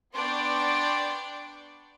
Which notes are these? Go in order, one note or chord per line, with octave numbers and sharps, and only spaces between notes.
B3 D4 D5 G5 C6 C#6